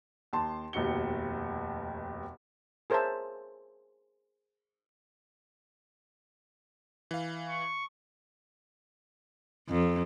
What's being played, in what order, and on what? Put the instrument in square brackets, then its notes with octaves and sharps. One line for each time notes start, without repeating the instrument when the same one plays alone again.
[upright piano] D#2 A5 C6
F1 D#2 B2 F#4 C#7 G7
[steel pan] G#4 A#4 C5 C#5 E5 A5
[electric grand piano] E3 F5
[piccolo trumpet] C#6
[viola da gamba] F2